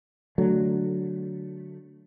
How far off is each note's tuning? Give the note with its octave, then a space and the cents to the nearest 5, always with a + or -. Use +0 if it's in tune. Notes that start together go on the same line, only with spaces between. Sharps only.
D3 +0 F#3 +0 A3 +0